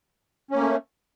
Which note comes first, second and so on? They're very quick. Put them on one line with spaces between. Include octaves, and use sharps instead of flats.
C#4 A#3 A3